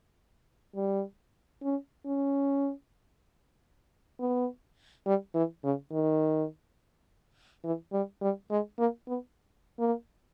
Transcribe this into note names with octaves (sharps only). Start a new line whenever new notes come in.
G3
C#4
C#4
B3
G3
E3
C#3
D#3
E3
G3
G3
G#3
A#3
B3
A#3